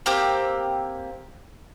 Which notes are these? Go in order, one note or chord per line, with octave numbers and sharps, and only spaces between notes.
A#3 C4 G4